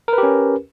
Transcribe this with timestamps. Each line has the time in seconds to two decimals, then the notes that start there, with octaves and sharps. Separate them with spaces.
0.08 A#4
0.13 B4
0.18 G4
0.23 C#4